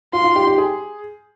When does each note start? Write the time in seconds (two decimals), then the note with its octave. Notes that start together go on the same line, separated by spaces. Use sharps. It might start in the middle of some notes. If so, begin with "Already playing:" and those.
0.13 F4 C6
0.24 F4
0.36 G4
0.47 G4
0.58 G#4